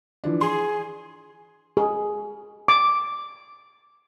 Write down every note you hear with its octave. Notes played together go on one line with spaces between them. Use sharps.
E3 F3 D4
G#4 C6
G#4
D6